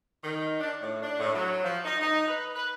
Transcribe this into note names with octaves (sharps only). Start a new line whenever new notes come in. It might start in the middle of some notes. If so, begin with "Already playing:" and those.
D#3
D4
A2
D4
A2
F#3
F3
D#4
D#4
B4
B4